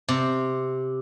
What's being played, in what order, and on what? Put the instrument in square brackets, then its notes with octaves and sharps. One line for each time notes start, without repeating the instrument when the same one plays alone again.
[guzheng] C3